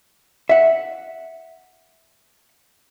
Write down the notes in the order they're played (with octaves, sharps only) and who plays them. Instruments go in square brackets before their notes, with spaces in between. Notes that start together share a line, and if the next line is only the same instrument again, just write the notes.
[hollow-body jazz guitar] E5 F#5